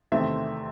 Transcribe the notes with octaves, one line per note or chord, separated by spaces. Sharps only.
E2 C3 D#3 A3 C4 E5